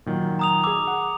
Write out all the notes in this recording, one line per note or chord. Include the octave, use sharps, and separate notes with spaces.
A#2 D#3 F#3
A#5 D#6 F7
G#4 D6 E6
F#5